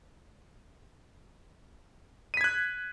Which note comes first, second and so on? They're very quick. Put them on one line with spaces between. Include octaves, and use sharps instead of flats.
D#7 B6 G#6 F#6